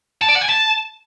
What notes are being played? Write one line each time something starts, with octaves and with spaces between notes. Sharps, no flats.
A5
D5
F#5
G#5
A5